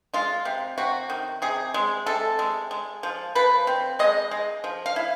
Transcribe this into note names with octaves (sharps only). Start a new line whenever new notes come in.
G#3 F4
C3
C3 F#4
D#3
C3 G#4
G#3
C3 A4
G#3
G#3
F3
F3 B4
C4
G#3 D#5
G#3
F3
F5
E4